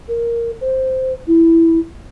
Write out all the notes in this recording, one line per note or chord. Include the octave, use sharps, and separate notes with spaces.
A#4
C5
E4